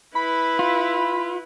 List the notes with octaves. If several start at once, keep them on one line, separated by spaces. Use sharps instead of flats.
E4 B4 B5
F4